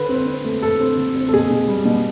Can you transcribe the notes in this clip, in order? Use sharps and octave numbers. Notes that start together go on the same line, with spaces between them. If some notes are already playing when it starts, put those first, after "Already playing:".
Already playing: D3 B4
C4
C4
A3
A3 A4
C4
D3
C4
A4
B2 G#4
B2
G3
B2